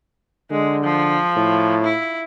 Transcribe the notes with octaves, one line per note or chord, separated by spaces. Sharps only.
D3 G#3
F3
A2
E4